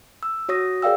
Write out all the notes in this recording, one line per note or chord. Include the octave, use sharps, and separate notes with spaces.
E6
F#4 C#5 D#6 A#6
G#4 A#4 D5 F5 G5 E6